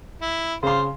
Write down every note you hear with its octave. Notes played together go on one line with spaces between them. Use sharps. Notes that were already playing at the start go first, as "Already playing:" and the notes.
E4
C#3 F4 C5 C6